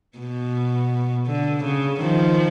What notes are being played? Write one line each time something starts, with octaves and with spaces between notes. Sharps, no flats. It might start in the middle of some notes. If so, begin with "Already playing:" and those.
B2
D3
C#3
D#3 F3